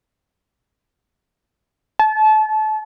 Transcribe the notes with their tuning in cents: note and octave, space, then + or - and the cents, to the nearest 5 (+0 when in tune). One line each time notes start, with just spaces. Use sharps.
A5 -30